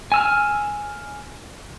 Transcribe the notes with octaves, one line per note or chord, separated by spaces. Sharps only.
G#5 E6 F6